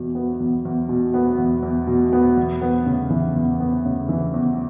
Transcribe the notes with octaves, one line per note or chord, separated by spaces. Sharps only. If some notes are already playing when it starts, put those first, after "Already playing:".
Already playing: E2 B2
B3
E2
E2
B2
B3
E2
E2
B2
B3
E2
B3
C#3
E3
E2
B3
C#3
E3
E2